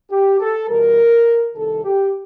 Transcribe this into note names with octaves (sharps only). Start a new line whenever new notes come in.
G4
A4
E2 B2 G3 A#4
C2 C3 D#3 A4
G4